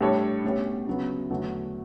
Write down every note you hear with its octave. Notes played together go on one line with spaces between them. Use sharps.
A2 G3 D4 A4 C#5
B2 A3 C#4 G4
D2 C#3 F#3 B3
E2 D3 F#3 A3